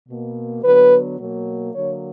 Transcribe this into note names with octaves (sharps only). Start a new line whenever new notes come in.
B2 A#3
D3 F#3 B3 B4
B2 F#3 A#3
D3 F#3 A#3 C#5